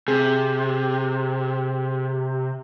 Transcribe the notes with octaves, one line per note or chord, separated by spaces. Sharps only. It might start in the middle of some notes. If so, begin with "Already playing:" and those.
C3 G#4